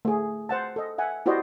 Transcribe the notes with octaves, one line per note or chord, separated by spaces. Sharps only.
A3 G#4
C5 F#5 A5
A4 D#5
E5 F#5 G#5
E4 F#4 G4 C5 D5 D#5